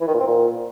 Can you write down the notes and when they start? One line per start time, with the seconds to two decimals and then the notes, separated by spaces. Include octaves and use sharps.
0.01 E3
0.07 D#3
0.14 A#2
0.20 C4
0.27 A#2